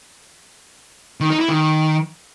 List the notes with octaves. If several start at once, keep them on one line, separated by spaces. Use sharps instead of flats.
D#3
D#4
E4
D#3